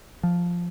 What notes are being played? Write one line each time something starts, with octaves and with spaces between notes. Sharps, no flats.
F3